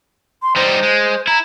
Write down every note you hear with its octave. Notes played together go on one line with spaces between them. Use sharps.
C6
G3 D#4 C5
G#3
E4 A#5